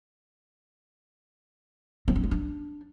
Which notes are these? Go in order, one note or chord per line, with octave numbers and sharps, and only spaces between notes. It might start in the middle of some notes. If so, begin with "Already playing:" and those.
C4
C#4
G#3
D4